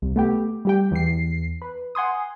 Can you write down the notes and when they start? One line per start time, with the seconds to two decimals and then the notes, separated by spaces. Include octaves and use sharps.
0.02 C2
0.16 A3 B3 G4
0.65 G3 G4 G5
0.91 E2 C7
1.62 B4
1.95 F#5 G#5 C6 D#6